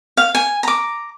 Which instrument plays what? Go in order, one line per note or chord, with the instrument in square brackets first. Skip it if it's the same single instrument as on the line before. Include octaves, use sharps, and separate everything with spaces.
[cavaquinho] F5
G#5
A#5 D6